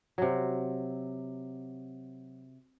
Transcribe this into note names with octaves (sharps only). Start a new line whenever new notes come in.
C3 F#3